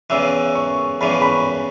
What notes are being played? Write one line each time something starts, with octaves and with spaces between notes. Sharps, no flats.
E2 C#3 E3 E6
C#6
E2 C#3 E3 B5
C#6
B5